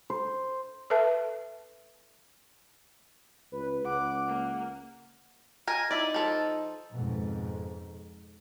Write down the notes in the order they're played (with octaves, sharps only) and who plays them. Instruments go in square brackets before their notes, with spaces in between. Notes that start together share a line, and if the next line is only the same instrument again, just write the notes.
[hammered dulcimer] C5
[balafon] A4 B4 E5 A5
[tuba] C#2 [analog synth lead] B4
[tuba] C#2 [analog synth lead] F#5 [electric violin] D6
[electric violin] A#3
[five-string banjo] A#4 D#5 G#5
[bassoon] D#4 [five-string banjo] E4 D5
[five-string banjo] F3 A4
[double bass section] F2 G#2 B2